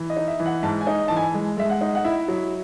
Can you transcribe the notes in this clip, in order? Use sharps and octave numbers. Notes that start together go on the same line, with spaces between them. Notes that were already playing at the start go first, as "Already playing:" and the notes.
Already playing: E3
D#5
D#4
E5
E3
F#5
G#2 A5
G#5
D#4
E3 A5
G#5
G#3
G#3 E5
F#5
D#4
F#5
E4 E5
F#3